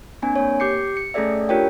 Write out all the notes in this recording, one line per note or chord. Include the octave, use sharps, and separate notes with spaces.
A#3 C4 D4 G#5
A#3 C#5
G4 D6 G6 C7 C#7
C#7
A3 C#4 G#4 A4 D5 E5
D4 F4 G4 A#4 C#5 G5